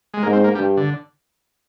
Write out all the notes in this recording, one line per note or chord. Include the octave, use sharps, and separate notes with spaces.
G#3
G#2 A#3
C4
A#3
G2 G3
D3